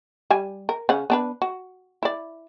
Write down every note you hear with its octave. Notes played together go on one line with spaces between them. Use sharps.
G3 G#5
A#4
C#3 C#4 F#5
B3 D4 B4
F#4
E4 D5